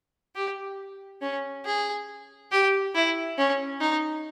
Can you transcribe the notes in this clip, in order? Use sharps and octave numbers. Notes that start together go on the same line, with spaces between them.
G4
C#4
G#4
G4
E4
C#4
D#4